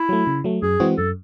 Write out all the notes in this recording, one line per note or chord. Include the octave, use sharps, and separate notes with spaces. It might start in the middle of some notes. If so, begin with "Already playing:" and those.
Already playing: E4
F#3 A3
C#3
F#3 A3
F#2 G#4
E3 G#3 C4 F#4
F#2 A4